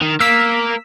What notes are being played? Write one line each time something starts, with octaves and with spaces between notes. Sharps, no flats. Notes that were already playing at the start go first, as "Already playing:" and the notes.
D#3
A#3 E6 B6